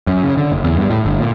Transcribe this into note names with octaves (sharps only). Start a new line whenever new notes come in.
F#2
C#3
D3
F#1
E2
G2
A2
G1
A#2